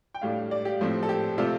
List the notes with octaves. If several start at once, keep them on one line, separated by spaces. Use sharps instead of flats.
G5
A2 G3 D4 F5
D5
G4
A2 F3 C4
A4
G4
C3 A3 C4 F4